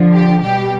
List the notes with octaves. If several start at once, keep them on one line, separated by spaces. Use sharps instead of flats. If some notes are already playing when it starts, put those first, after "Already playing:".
Already playing: D3 F3
G4
B2 G3 G4